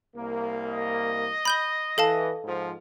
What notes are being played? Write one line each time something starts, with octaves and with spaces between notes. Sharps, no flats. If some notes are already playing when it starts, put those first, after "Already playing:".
C2 A#3
D#5
B5 G6 G7
E3 A4 F5 A5
G#2 F3